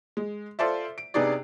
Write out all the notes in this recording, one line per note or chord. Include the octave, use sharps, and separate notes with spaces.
G#3
F4 A4 C5 D5 E5
D7
C3 B3 D4 D#4 G#4 D5